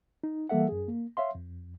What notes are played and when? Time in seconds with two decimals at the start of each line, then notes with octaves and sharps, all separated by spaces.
0.24 D#4
0.49 E3 G3 A#3 A4 E5 F#5
0.69 F#2 G#4
0.88 A#3
1.17 C#5 E5 F5 C6
1.35 F2